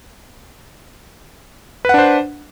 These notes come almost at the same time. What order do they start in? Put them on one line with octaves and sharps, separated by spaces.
B4 F#5 D4 C5